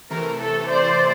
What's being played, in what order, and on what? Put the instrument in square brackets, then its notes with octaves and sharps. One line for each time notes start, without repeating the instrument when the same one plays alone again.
[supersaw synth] C3 E3 A3 [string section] A#4
[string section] A4
C5 D5